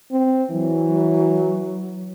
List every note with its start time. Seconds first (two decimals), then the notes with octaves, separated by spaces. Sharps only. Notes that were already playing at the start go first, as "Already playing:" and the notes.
0.12 C4
0.51 E3 F#3